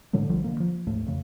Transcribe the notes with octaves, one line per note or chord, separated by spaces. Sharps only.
A2 D3 F#3 G#3
A#1 D3 F3 G3
D3 A#3
F3
D#2 G#2 A3
F2 C#3